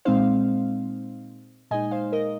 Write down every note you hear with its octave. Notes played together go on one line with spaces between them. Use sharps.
A#2 G#3 C4 D#4 C5 F5
A#2 G#3 D#4 D#5 G#5
C5 F5
A#4 D#5